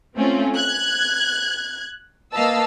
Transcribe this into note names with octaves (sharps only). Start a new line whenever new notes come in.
A3 C4 C#4 F4
F#6 G#6
A#3 B4 D#5 F5 A5 E6